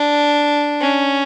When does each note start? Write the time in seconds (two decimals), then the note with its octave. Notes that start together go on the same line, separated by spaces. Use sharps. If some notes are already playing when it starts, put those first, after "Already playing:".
Already playing: D4
0.82 C#4